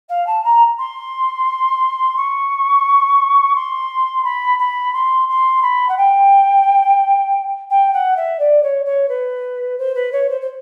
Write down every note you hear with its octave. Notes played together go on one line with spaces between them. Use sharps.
F5
A5
A#5
C6
C#6
C6
B5
B5
C6
C6
B5
F#5
G5
G5
F#5
E5
D5
C#5
C#5
B4
C5
B4
C#5
C5
C5